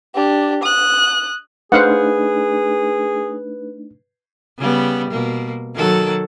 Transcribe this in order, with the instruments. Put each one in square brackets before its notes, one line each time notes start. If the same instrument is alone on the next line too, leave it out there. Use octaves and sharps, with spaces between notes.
[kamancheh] D4 G4
D#6 F#6
[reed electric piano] A3 D4 D#4 [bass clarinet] G#4 [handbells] B4 [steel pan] C5 F5 F#5
[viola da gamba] C#3 G3 B3
B2 A#3
D#3 F#3 A4